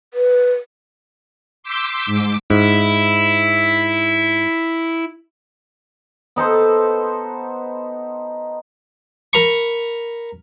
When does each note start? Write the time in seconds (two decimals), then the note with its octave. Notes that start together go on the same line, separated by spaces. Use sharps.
0.14 B4
1.63 C6 D6 E6 G6 B6
2.06 G#2 D6
2.51 G#2 E4
6.36 B3 D#4 A4 C5
9.33 A#4 A#5 B5 C#6